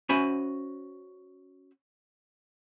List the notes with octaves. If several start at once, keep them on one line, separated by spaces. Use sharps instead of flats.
C#4 F#4 C5 E5 G#5 B5